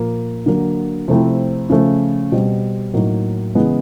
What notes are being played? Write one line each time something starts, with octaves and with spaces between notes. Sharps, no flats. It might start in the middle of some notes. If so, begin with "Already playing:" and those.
Already playing: A#2 F3 A#3
D3 F#3 A#3
C3 F3 A3 C4 E4
C#3 F3 A3
B2 G3 C4
A2 F#3 A#3 D#4
C#3 E3 G#3 B3